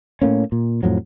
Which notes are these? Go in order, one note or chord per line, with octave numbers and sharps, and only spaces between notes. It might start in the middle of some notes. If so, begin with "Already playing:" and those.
A2 A3 A#3 C#4
A#2
F2 A2 F3 F#3